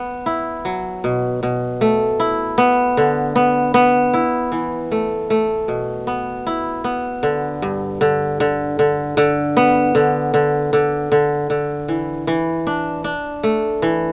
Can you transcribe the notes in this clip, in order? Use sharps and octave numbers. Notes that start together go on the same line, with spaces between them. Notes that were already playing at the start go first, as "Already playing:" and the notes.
Already playing: B3
E4
F#3
B2
B2
A3
E4
B3
D3
B3
B3
E4
E3
A3
A3
B2
B3
E4
B3
D3
G2
D3
D3
D3
D3
B3
D3
D3
D3
D3
D3
E3
E3
D4
D4
A3
E3